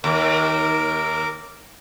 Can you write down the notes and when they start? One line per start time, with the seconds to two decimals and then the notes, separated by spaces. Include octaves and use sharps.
0.04 D#2 A#4 D6